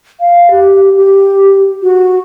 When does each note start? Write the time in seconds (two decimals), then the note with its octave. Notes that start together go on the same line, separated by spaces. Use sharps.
0.20 F5
0.51 G4
0.97 G4
1.82 F#4